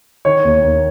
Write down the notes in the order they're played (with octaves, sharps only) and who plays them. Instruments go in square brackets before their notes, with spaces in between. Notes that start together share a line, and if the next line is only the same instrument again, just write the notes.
[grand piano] D#3 C#5
D#2
D#2